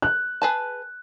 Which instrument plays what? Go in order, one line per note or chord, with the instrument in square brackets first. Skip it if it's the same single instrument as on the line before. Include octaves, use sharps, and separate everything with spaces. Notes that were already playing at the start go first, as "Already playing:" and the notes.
[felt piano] F#6
[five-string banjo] G#4 B4 A5